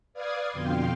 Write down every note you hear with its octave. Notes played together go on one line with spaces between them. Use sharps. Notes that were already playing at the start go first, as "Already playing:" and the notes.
B4 D5 F5 D#6 F6 G#6
F2 B2 D3 F5 G5 C6